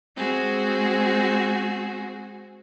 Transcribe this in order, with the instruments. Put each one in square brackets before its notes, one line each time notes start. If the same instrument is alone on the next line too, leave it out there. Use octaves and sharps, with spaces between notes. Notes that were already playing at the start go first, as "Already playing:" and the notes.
[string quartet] G#3 C4 F#4 G#4